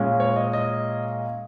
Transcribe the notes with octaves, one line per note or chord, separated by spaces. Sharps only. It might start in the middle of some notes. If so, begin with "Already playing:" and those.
Already playing: A#2 G#3 C#4
C#5
D#5
D#5